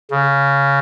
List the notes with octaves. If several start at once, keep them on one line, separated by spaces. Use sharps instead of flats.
C#3